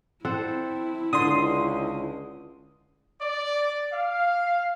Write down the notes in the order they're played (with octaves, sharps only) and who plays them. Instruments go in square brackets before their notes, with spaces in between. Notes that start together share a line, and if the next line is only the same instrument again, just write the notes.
[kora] C4 A4 F#5 [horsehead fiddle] E4
[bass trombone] C#2 [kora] D3 [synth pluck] C6 D#6
[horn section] D5
F5